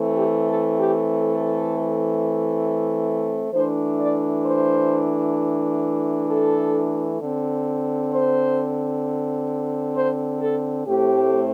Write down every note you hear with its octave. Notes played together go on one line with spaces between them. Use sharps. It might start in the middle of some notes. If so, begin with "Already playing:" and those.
Already playing: E3 A3 C4
G4
A4
G4
A4
E3 A3 D4 C5
D5
C5
A4
D3 C4
C5
C5
A4
A2 A3 C4 G4